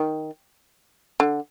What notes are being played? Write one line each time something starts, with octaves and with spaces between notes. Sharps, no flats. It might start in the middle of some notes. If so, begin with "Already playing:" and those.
Already playing: D#3
D3